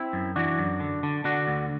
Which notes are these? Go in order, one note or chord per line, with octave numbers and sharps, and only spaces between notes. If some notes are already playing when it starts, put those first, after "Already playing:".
Already playing: C4 E4
F#2
E3 D4 F#4
F#2
D3
D3
D3 D4 F#4
D2